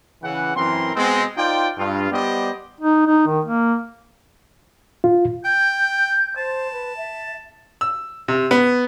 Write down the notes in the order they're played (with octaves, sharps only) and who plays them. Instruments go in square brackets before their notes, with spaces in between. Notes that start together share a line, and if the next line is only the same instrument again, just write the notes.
[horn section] C#3 E3 F#5
F#2 E3 C4 A#4 C6
B2 G#3 C4
D#4 F4 C5 D5 G5
G2 F4
G3 B3 G4 C5 D5 D#5
[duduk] D#4
D#4
D#3
A#3
[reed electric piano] F4
[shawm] G5 [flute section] G6
[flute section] C5 [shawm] A5
[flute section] B4
E5
[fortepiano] E6
C3
B3